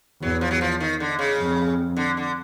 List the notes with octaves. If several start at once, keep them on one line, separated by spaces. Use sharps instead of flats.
E2 F#3
F3
F#3
F3
D#3
D3
C#3
F2
D3
D3